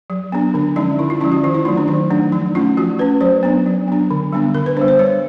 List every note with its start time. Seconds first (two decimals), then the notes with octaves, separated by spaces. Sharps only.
0.10 F#3
0.32 B3 D4
0.54 D3 D4
0.76 F3 G#3 C#4 D#4
0.99 D3 E4
1.10 F4
1.21 F3 G#3 C#4 E4
1.32 F#4
1.43 D#3 F4
1.55 E4
1.65 F#3 A3 D#4
1.77 D4
1.88 D#3 D#4
2.10 F#3 A3 D4
2.32 F3 D#4
2.55 A3 C#4 F4
2.77 F3 F#4
2.99 A3 C#4 B4
3.21 F#3 C5
3.43 B3 D4
3.66 F#3
3.88 B3 D4
4.10 D3
4.33 G3 B3 D4
4.55 D3 A#4
4.66 B4
4.77 G3 B3 D4 C5
4.88 C5
4.99 G3 C#5